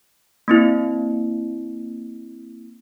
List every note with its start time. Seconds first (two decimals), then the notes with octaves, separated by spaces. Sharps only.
0.48 A#3 C4 E4